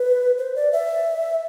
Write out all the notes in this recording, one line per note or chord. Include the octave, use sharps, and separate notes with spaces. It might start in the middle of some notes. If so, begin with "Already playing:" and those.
Already playing: B4
C5
D5
E5